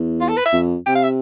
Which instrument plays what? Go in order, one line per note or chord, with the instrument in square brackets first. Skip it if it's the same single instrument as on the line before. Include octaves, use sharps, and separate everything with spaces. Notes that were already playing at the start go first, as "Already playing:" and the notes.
Already playing: [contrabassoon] E2
[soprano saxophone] F4
A4
B4
E5
[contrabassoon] F2
[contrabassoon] C3 [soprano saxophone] G5
[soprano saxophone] F5
E5